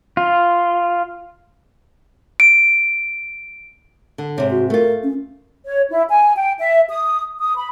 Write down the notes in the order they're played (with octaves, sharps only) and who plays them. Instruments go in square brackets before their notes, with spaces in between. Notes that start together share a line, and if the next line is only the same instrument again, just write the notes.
[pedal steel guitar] F4
[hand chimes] D7
[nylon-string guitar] D3
[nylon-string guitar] G#2 C3 [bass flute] C#5
[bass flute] F#4
[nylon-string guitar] A3 F4 [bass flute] A#4
[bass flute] C#4
[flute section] C#5
E4
G#5
G5
E5
D#6
D#6
B5